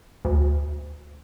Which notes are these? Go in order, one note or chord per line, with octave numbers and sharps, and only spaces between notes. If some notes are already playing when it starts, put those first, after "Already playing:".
D2